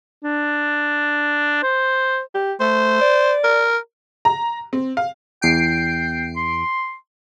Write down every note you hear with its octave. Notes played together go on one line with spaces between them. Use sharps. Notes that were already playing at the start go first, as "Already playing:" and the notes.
D4
C5
G4
A3 C5
D5
A#4
A#5
C4
F5
E2 G5 C7 D7
C6